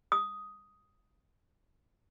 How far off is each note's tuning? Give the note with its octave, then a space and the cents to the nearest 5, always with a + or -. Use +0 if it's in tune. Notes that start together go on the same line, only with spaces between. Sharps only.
D#6 +5